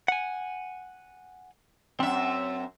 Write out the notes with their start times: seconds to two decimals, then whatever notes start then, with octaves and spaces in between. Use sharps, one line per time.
0.08 F#5 G#5
2.00 F#2 C4 E5